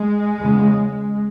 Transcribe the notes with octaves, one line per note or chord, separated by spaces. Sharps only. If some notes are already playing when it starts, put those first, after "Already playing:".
Already playing: G#3
E2 C#3